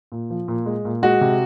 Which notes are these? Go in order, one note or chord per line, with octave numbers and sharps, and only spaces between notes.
A#2
F3
A#2
G#3
A#2
G#3 F#4
C3